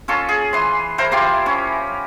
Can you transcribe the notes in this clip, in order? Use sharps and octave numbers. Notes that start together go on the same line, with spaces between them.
C#4 F4 A4
G#4
E3 C6
E4 A#4 C5 A#5
E4 F4 G4 C6
C#4